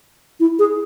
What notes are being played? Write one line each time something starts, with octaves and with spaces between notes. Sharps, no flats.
E4
G#4